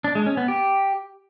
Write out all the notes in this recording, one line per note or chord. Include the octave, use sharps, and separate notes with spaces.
D4
G#3
C#4
B3
G4